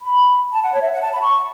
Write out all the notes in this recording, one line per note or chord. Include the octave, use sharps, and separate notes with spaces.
B5
A5
F#5
C#5
E5
F#5
A5
B5
C#6